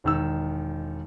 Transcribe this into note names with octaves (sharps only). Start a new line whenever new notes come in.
E1 D#3 E6